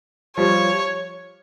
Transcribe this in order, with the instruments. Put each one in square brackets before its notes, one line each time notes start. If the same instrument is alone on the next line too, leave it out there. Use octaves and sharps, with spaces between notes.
[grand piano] F3 G3 [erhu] C#5